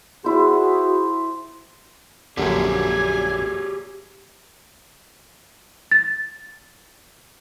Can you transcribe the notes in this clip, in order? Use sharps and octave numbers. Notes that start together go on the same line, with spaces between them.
E4 F#4 G#4 C5
A#1 F#2 D3 G4 G#4 C#5 D5 G#5
A6